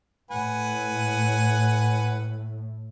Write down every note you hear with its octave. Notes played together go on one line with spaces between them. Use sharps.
A2 B4 F#5 G#5